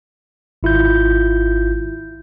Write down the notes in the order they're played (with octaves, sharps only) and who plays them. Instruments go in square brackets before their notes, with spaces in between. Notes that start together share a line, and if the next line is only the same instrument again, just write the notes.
[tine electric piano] G#1 E4 F4 G6